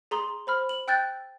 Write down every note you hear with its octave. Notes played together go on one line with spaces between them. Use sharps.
G#4 A#5 C6 D#6
C5 B5 F6
F#7
G5 E6 F#6 G6 A6